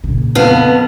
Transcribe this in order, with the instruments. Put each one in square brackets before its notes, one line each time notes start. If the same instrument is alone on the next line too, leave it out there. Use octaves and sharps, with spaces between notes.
[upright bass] A#2 C#3
[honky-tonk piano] F2 D#7 [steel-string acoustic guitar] B3 B4 F5